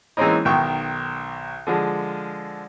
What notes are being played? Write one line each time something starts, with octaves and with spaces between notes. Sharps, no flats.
E3 G#3 A#3 C4 C#4 D#4
B1 D#3 G5 C#6
D3 F3 G#3